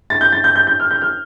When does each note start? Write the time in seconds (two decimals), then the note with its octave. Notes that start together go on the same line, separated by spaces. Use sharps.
0.10 A6
0.21 G6
0.32 A6
0.44 G6
0.55 G6
0.67 G6
0.80 F6
0.91 G6
1.02 F6